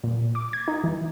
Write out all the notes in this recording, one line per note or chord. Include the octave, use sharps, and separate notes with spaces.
A#2
D6
G#6
D#4
E3